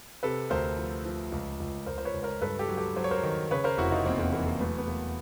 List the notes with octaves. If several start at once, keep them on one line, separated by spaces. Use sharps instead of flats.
C3 A4 B4
D2 A#4 C5
F3
F3
C#2
C#2
C#2 A#4 C5
C5
B4 C#5
C#2
A#4 C5
G2 A4 B4
G4 A4
F#3
G4 A4
F#3 C5
C#5
A#4 C5
D#3
C#3 B4 C#5
A#4 C5
F1 E4 F#4
D#4 F4
E2 A#3 C4
A#3 C4
E3 A#3 C4
A#3
F#3 A3 B3
B3
E2 A#3